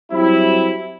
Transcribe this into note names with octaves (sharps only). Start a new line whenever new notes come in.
F#3 G3 C4 E4